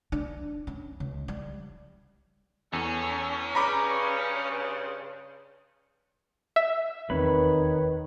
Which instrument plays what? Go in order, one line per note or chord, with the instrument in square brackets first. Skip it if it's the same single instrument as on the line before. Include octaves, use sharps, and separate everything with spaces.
[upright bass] D4
C#4
C#2
G3
[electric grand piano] E2 [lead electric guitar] C#4 [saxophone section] A4
[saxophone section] G2 C#3 [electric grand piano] A#5 B5 D6
[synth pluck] E5
[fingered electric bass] D#1 E2 C4 [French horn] D#3 [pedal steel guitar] B4 C#5 B5